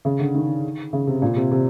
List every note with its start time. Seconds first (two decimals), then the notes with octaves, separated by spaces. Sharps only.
0.05 C#3
0.20 D3
0.35 D#3
0.93 C#3
1.07 C3
1.22 A#2
1.36 C3
1.52 C3